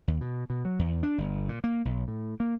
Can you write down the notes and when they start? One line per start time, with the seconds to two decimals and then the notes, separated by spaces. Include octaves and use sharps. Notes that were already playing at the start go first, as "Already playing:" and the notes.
0.08 D#2
0.21 B2
0.50 B2
0.65 F#3
0.79 E2
1.03 D4
1.18 G1
1.49 A#2
1.64 A#3
1.85 B1
2.08 A2
2.40 A#3